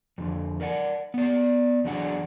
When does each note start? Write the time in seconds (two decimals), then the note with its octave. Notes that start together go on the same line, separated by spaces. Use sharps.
0.18 F2 D3
0.60 A#4 D5 F#5
1.14 B3 D5
1.84 E2 F#3 D4 G#4 F#5